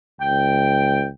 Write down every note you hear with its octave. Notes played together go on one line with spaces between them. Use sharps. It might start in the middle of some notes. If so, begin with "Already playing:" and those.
C#2 G5